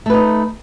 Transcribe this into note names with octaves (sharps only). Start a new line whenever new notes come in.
A3 D#4 B4